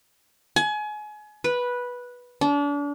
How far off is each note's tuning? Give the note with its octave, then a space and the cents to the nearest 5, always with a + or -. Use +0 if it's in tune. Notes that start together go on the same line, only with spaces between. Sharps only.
G#5 +30
B4 -10
D4 -35